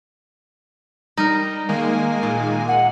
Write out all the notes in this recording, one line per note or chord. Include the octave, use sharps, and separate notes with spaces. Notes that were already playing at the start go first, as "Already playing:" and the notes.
G3 D#4 A#4
D#3 G#3 A#3 G#5
A#2
F#5